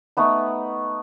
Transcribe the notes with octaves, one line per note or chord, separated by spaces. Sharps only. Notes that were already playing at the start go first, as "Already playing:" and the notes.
A3 B3 D#4